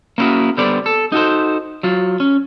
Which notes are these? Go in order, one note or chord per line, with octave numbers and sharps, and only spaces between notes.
A#3 B3 C#4 E4 F#4 G#4
D3 G3 B3 C5 D5
A4
D#4 F#4 A4 C5
F#3 F4
C#4